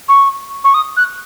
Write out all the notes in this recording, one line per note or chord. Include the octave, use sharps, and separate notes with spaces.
C#6
C#6
D#6
F#6